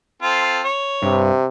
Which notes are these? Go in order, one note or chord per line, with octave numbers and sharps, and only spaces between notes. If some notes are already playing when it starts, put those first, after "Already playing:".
C4 F4 A4
C#5
G2 C3